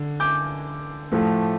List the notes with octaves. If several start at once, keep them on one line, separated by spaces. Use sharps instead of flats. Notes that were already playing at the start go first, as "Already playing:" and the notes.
Already playing: D3
D6 G6
A2 F3 A3